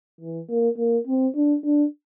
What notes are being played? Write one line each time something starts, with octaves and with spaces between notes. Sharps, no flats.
E3
A#3
A#3
C4
D4
D4